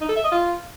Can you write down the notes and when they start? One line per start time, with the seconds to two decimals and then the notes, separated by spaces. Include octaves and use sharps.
0.01 D#4
0.09 A4
0.16 E5
0.24 D#5
0.32 F4